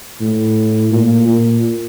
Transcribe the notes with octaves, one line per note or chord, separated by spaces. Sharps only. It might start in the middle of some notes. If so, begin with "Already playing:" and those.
A2
A#2
A#2